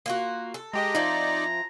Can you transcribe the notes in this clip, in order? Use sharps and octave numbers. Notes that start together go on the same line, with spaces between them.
A#3 F4 F#4
A4
G#3 G4 D#5 A#5
F3 C4 D#4 E4 D5